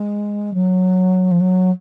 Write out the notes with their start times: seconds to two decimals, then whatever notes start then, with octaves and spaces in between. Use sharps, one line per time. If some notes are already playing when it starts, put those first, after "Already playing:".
Already playing: G#3
0.54 F#3
1.31 F3
1.40 F#3